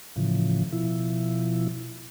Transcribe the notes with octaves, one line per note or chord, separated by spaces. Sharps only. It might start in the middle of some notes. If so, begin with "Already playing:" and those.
A2 C#3 E3 F3
B2 F3 E4